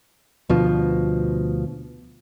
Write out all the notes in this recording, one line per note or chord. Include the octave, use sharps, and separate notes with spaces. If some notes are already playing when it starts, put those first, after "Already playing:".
D2 B2 F3